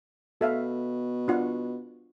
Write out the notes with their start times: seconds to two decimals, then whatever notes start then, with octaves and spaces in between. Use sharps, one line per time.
0.41 B2 A4 E5 F5
1.28 D4 F4 F#5